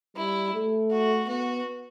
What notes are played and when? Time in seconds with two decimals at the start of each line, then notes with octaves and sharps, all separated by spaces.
0.16 G3 E4
0.54 A3
0.92 F#4
1.28 B3 F#4